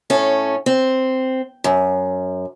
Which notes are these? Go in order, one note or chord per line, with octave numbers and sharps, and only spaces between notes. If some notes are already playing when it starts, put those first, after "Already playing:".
A2 C#4 A4
C4
F#2